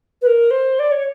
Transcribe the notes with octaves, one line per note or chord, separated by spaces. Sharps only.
B4
A#4
C5
D5
C#5